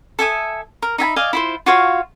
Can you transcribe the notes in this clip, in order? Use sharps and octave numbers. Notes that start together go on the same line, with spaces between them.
A4 E5 G#5 D#6
A#4
D#4 E5 G#5 B5
D5 D#5 F5 G#5
E4 F4 C5
F4 F#4 C#5 F5